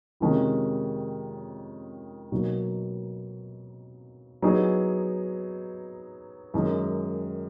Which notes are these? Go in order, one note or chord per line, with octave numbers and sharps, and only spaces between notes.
F2 C3 D#3 G#3 C#4
B2 F#3 A#3 D#4
F#3 B3 D#4 G#4
F#2 D#3 G#3